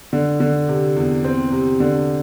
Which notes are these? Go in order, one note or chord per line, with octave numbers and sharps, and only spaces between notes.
D3
D3
C3
E2
C4
C3
D3